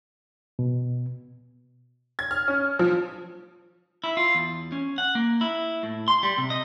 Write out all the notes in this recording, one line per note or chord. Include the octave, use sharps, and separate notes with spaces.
B2
G#6
F6
C#4
F3
E4
F4
E2
C#4
F#5
A#3
E4
A2
C6
G3
C3
D#5